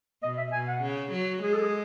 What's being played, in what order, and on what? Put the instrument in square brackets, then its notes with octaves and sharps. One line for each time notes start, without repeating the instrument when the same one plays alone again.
[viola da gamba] B2 [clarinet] D#5
[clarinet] E5
[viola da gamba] B2 [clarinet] G#5
[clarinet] F#5
[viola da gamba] C#3
F#3
[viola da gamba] G#3 [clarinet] G#4
[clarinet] A4
G#4